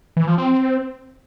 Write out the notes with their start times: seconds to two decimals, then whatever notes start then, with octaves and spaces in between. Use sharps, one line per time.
0.17 E3
0.27 F3
0.38 C4